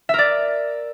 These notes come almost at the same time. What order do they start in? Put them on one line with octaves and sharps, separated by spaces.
E5 A#4 D5